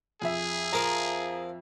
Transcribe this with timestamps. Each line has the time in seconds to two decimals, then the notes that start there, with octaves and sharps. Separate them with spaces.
0.22 F2 G#4 E5
0.73 F3 A#4 A#5